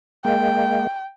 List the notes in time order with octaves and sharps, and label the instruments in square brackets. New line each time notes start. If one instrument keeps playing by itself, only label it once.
[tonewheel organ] G#3 A#3 [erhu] G5